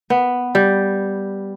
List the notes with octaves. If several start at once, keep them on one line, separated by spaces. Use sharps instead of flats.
B3
G3